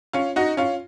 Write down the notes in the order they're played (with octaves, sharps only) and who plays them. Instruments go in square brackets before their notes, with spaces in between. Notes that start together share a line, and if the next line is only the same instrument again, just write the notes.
[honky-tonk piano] C#4 F4
D#4 F#4
C#4 F4